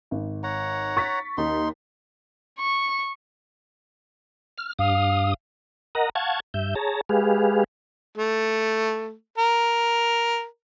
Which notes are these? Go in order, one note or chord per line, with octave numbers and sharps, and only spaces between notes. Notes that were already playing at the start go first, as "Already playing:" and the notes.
G#1
C#5 F#5 A#5
C#6 A6 B6
D#2 D#4 C6
C#6
F6
G2 F5 D#6
A#4 D#5 F#5 A#5
F5 F#5 A5 C#6 G#6
G2 E5 G6
G#4 C#5 A5 A#5
G#3 G4 G#4 B4 F5
A3
A#4